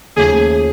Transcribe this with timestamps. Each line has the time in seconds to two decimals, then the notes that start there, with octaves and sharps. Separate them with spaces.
0.16 D#2 C#3 F3 A3 G#4